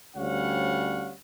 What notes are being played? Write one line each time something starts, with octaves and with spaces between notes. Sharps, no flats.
D2 G3 C#4 C#5 F5 F#5